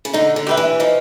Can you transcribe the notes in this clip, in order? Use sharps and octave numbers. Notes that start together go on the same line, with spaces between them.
C#3
D3 D#4
D3
G4 B4 E5
E3
F3 D#4